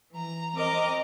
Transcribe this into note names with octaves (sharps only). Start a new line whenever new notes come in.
E3 A#5
C4 A#4 D#5 A#5 D6